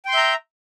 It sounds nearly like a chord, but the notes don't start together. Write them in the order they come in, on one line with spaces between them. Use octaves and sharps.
G5 C6 G6 E5 A#5